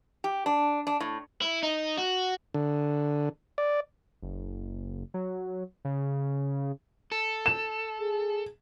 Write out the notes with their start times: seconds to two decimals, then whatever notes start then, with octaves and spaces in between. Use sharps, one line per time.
0.24 G4
0.46 D4
0.87 D4
1.00 A2
1.42 E4
1.63 D#4
1.98 F#4
2.54 D3
3.58 D5
4.22 F#1
5.14 F#3
5.85 C#3
7.12 A4
7.46 E7
8.00 G#4